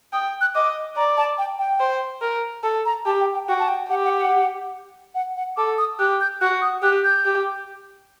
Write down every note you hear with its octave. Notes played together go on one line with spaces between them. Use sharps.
G5 D#6
F#6
D#5 D6
D5 A#5
A5
G5
G5
C5
A#4
A4
A#5
G4 A5
G5
G5
F#4 G5
A5
G5
G4 F#5
F#5
F#5
F#5
F#5
A4 D6
D#6
G4 F#6
G6
F#4 F#6
D#6
G4 F#6
G6
G4